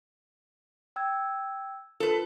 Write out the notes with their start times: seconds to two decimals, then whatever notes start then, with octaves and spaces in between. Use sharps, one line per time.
0.96 G5 E6 G#6
2.00 F4 A4 B4